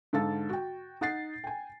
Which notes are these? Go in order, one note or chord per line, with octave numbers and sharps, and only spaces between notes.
G#2 D3 A4 F5 A6
F#4 G5
D#4 F#5 A6 C7
G5 G#5